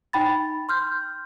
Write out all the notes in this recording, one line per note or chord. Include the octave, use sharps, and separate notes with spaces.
D#4 G5 B5 A6
C6 F6 G6